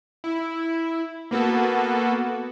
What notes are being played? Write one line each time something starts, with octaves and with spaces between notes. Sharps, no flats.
E4
A#3 B3 F#4 A4